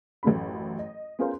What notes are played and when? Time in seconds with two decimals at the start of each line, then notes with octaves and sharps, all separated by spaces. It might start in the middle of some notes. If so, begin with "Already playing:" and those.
0.23 A1 F#2 A3 C#4 B5
0.79 D#5
1.19 B3 C#4 F4 G#4 A#4 C5